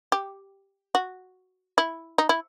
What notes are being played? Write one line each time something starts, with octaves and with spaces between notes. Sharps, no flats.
G4
F#4
E4
D#4
E4